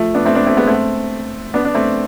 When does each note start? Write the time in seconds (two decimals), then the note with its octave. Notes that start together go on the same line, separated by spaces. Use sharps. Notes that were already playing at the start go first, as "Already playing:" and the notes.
Already playing: F3 A3
0.15 B3 D4
0.25 A3 C4
0.35 B3 D4
0.47 A3 C4
0.57 G#3 B3
0.67 A3 C4
1.54 B3 D4
1.65 D4
1.75 A3 C4